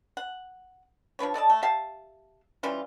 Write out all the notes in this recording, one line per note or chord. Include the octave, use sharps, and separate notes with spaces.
F#5
F3 D4 B4 C#5
A4 D5 D#5 A5
A3
G4 E5 F5 A5
E3 G3 C#4 F4